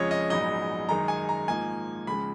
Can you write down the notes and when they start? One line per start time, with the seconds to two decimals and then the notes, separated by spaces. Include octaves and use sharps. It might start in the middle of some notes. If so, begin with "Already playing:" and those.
Already playing: F2 C#3 G#3 C#4 F4 C#5 D#5
0.11 D#5
0.30 A#1 G#2 F#3 B3 D#4 D#5
0.89 F#2 D#3 G#3 D#4 A#5
1.08 G#5
1.29 A#5
1.48 G#2 F3 A#3 D#4 G#5
2.07 C#2 C#3 F3 G#3 B5